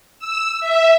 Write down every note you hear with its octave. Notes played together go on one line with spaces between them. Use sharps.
E6
E5